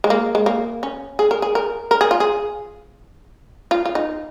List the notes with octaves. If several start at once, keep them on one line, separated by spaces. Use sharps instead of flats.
G#3
A#3
G#3
A#3
C#4
G#4
A#4
G#4
A#4
A#4
G#4
F4
G#4
F4
F4
D#4